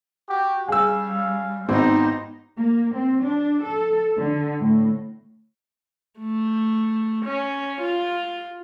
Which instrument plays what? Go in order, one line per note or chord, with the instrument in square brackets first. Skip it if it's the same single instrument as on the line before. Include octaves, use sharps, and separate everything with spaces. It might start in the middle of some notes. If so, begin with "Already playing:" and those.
[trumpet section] F#4 G4
[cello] G3 [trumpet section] C#4 F5 [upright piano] G#4 E6
[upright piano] G#1 C4 [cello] B3 D#4 [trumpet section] G4 B4 C5
[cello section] A#3
C4
D4
A4
D3
A2
[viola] A3
C#4
F4